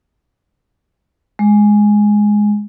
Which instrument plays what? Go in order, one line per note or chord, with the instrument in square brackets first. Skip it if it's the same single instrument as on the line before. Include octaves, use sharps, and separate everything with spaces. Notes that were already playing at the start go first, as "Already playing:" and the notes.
[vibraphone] G#3